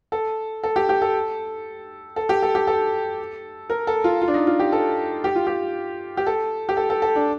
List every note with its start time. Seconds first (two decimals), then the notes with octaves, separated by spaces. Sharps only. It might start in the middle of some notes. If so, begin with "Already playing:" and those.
0.12 A4
0.63 A4
0.76 G4
0.89 G4
1.02 A4
2.16 A4
2.29 G4
2.43 A4
2.55 G4
2.67 A4
3.70 A#4
3.87 A4
4.04 F4
4.22 F4
4.28 D4
4.34 D#4
4.47 F4
4.60 G4
4.72 A4
5.24 G4
5.35 F4
5.47 G4
6.17 G4
6.26 A4
6.69 G4
6.77 A4
6.90 A4
7.02 A4
7.16 D4